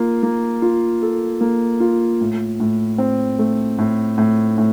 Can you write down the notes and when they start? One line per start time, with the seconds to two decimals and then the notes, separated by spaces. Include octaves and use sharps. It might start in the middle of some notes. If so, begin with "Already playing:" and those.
Already playing: A#3 F4
0.23 A#3
0.62 F4
1.02 A4
1.41 A#3
1.80 F4
2.21 A2
2.60 A2
2.98 C4
3.39 A3
3.78 A2
4.18 A2
4.58 A2